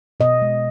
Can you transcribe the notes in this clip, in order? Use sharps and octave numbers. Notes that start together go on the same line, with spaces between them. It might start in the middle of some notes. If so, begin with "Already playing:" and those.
B2 D#5
G#3